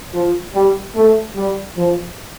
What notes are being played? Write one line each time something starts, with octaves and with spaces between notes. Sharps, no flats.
F3
G3
A3
G3
F3